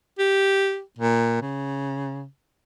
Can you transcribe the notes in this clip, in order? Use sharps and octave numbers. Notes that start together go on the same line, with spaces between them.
G4
A#2
C#3